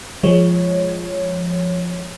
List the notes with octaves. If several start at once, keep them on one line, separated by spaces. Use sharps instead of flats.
F3 G#3 C#5